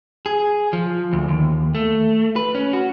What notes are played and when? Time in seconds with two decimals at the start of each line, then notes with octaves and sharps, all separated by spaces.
0.26 G#4
0.73 F3
1.13 D2
1.28 D#2
1.75 A3
2.36 B4
2.55 C#4
2.73 F#4